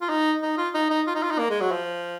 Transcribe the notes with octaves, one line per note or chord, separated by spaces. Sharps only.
F4
D#4
D#4
F4
D#4
D#4
F4
D#4
F4
D#4
A#3
G#3
F#3
F3